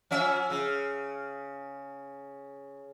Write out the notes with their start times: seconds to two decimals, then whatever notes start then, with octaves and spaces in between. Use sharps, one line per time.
0.11 F3 C#4 E5
0.50 C#3